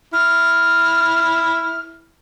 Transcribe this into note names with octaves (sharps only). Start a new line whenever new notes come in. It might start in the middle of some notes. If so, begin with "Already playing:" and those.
E4 F6